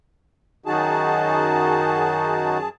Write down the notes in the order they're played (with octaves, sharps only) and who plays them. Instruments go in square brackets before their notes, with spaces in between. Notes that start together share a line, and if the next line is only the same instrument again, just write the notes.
[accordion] F#2 G#4 A5 [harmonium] D#3 D#4 F#4